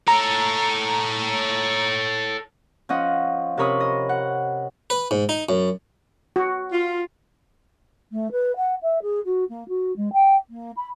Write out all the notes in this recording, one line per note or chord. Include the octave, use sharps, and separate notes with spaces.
A4 C#5 A#5
F3 C#4 D#5 F#5
C3 C#4 A#4 C#5 B5 D#6
D#5
F#5
B4
G#2
D#4
F#2
F#4
F4
A3
B4
F#5
E5
G#4
F#4
A#3
F#4
G#3
G5
A#3
B5